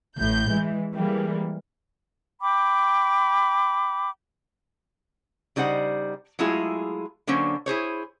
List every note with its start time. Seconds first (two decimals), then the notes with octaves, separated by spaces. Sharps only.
0.18 A1 A2 G6
0.50 E3 G#3
0.94 E3 G3 G#3 A#3
2.41 G5 B5 D6
5.56 C#3 G3 D#4 C5 F#5
6.39 F#3 G#3 A3 E4 F4 G#4
7.27 D3 F#3 A#3 C#4 C5
7.66 E4 G#4 C5 C#5